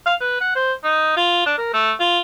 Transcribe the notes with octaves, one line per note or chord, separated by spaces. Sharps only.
F5
B4
F#5
C5
D#4
F4
D4
A#4
A3
F4